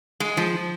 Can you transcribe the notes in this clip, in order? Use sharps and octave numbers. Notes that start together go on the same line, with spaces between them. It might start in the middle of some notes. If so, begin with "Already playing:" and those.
G#3
F3